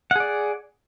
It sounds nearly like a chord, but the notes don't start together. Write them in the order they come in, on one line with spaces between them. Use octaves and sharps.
F#5 G#4 D5